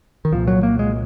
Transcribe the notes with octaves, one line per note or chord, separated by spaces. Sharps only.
D#3
C2 A#2 F3
F#3
A#3
G#3